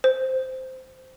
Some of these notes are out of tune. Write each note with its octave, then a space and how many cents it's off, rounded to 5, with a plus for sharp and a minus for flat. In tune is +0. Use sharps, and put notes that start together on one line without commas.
C5 -10